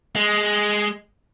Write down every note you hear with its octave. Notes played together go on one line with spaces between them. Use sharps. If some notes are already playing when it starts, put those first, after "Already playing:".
G#3